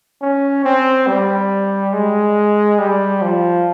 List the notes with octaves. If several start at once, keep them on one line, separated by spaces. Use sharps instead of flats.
C#4
C4
G3
G#3
G3
F3